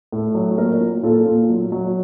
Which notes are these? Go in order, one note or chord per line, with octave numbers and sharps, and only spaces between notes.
A2
F#3
A#2 F#4 A#4
A#2
A#2 F4 A4
A#2
F#3
F#3